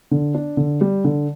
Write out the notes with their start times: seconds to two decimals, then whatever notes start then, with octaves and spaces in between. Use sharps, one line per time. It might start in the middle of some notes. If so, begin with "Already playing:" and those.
0.11 D3
0.35 D4
0.57 D3
0.81 G3
1.04 D3